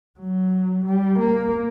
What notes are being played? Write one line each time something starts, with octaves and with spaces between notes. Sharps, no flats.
F#3
G3
A#3